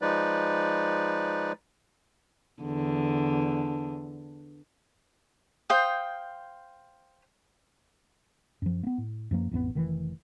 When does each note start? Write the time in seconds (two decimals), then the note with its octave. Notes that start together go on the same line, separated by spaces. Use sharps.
0.02 F3 G#3 D#4 B4 D5
2.62 E2 D3
5.70 C5 F5 G5 D#6
8.62 F#2 F3
8.83 A#3 B3
8.98 A2
9.31 F#2 F3 A#3
9.51 A1 F2 A3 B3
9.75 F1 D#3 E3